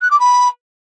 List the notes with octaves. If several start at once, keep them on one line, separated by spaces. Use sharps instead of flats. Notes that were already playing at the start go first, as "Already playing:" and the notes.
F#6
D6
B5